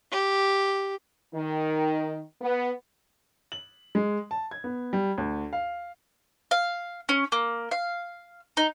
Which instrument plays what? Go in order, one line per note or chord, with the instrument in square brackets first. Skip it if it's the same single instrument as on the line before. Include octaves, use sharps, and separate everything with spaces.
[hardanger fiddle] G4
[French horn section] D#3
B3
[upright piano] F#7
G#3
A5
G#6
B3
G3
D2
F5
[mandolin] F5
C#4
A#3
F5
D#4